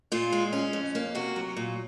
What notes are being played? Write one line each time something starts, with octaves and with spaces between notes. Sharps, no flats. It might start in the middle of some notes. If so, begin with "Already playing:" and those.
A#2 F4
G#3
C#4
F2
A#3
C3 F#4
F#3
A#2